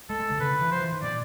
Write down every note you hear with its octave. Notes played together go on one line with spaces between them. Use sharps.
G#3 A4
G#3
D3
C#3 B4
D3
E3
F3 C5
E3
D#3
A#2 D5